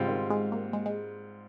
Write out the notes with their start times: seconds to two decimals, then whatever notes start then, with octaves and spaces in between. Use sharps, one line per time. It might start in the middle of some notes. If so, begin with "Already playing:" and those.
Already playing: G#2 C#3 G3 C4 F4
0.08 D#3
0.30 G#3
0.52 A#3
0.73 G#3
0.86 G#3